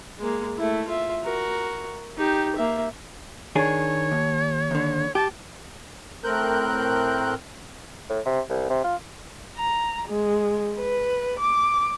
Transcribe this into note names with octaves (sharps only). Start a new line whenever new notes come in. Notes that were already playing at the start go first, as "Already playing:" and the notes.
G#3 A#3
A3 E4
F4 E5
F#4 A#4
D#4 G4
A#3 E5
D#3 D4 G#4 C#5
D#2
D#2 D3
G4 A5
A2 C4 A#4 F#6 G6
A2
C3
C2
C3
F4
A#5
G#3
B4
D6